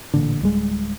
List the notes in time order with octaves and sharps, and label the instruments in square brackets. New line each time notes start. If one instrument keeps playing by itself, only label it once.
[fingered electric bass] A1 A#2 D3
D1 G3 G#3